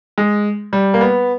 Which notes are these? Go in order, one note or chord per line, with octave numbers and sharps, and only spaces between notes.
G#3
G3
A#3
B3